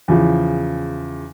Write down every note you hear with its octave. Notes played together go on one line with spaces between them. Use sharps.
E2 C#3 F3